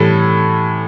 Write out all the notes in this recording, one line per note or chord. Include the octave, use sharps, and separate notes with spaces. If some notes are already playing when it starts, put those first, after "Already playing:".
Already playing: A2 E3 G3 A4